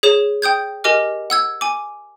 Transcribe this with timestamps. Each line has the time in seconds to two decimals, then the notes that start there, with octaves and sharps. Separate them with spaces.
0.03 G#4 C#5 E7
0.42 G5 D#6 G6 G#6
0.84 G4 A#4 D#5 G#5 D6 F6
1.30 F#5 E6 G#6
1.61 G#5 D6